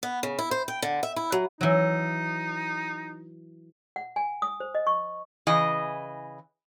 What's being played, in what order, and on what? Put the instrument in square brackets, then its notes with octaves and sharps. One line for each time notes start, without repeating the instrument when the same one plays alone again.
[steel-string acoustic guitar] B3
C#3
E4
C5
G5
D3
E5
E4
F#3
[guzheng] E3 F#3 [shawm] D#4
[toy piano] F#5
G#5
D#6
C5
D#5
C#6
[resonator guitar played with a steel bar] C#3 E3 G#4 D#5